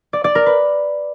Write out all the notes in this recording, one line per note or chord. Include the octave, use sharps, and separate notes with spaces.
D5
D5
A#4
B4